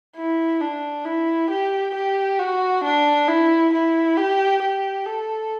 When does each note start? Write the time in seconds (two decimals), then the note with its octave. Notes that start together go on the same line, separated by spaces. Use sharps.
0.16 E4
0.61 D4
1.05 E4
1.50 G4
1.94 G4
2.40 F#4
2.84 D4
3.28 E4
3.73 E4
4.18 G4
4.62 G4
5.06 A4